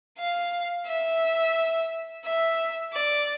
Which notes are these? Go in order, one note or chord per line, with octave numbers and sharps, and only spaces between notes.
F5
E5
E5
D5